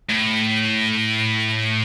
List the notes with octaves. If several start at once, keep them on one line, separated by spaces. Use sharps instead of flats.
A2